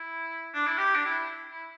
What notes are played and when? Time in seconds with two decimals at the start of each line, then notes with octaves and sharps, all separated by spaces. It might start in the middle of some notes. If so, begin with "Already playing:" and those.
Already playing: E4
0.54 D4
0.66 E4
0.78 G4
0.95 D4
1.06 E4
1.51 E4